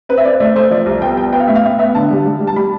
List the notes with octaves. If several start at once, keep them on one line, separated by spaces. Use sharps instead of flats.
C4 B4
E5
C4 D5
A3 D5
A3 C5
F3 D5
C2
B3 G5
B3 G5
B3 G5
F5
A2 E5
F5
A2 E5
B3 E5
D3 A5
G3
G3
G3
A5
G3 B5